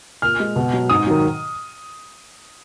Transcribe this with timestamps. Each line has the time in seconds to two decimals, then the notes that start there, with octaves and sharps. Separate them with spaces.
0.22 A#2 F6
0.40 G#3
0.56 B2
0.73 F#3
0.90 G#2 D#6
1.06 D#3 F#3